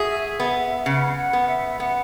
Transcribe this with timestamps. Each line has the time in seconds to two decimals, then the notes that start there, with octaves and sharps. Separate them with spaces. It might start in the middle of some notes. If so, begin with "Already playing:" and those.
Already playing: F#4 G#4 E5
0.40 B3
0.86 C#3 F#5
1.17 F#5
1.33 B3
1.48 E5
1.79 B3 F#5